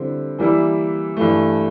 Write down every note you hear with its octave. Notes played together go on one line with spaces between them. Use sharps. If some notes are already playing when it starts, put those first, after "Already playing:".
Already playing: D3 G3 C4 E4
E3 G3 A#3 E4
G2 E3 A3